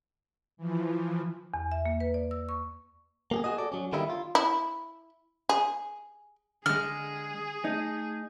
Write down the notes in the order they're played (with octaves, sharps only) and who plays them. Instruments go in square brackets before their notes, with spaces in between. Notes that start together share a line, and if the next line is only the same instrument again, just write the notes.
[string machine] E3 F3
[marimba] E2
E5
A#3
B4
D5
E6
C#6
[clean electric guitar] A#3 G4 G#4
F#4 G#4 D#5
A4 D5
F#3 C#4
D3 D#3 G3 A#3 D#4 E4
F4
[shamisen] E4
G#4
[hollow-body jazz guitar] D3 G#3 [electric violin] G#4 [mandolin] F6
[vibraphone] A3 [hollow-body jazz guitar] D#4